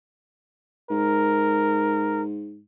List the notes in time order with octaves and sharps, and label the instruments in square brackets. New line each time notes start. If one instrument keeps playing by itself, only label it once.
[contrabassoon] G#2 [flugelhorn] A#4